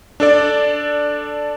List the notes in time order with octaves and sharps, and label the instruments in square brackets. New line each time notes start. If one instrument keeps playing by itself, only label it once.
[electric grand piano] D4 A4 D5